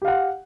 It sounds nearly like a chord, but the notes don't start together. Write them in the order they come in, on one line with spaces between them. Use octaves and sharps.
G4 F5 F#5